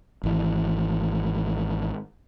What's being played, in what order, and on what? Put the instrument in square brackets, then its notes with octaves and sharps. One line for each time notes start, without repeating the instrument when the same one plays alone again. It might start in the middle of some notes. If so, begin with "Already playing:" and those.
[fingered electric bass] G#1 E3